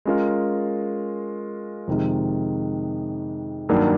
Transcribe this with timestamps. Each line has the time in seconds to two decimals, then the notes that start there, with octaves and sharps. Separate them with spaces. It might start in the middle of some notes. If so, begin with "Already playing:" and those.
0.05 G#3 C#4 F4 A#4
1.87 F2 C3 D#3 G#3
3.69 G2 D#3 F#3 A#3 D4